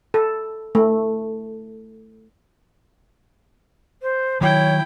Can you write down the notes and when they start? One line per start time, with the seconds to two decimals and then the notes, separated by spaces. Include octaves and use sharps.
0.14 A4
0.75 A3
4.02 C5
4.41 D#3 F#3 E4 C#5 G5